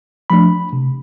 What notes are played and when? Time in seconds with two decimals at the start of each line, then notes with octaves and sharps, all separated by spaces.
0.30 F3 A3 D4 B5
0.73 C3